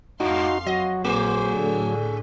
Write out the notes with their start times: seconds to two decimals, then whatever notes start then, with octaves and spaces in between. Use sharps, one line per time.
0.20 F2 G#2 D#4 F#4 F5 C6
0.66 F#3 F#4 D#5
1.04 A#1 A3 G#4 C5
1.56 A2 D3